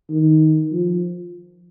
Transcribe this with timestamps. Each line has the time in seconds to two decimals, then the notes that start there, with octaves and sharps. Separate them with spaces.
0.10 D#3
0.72 F3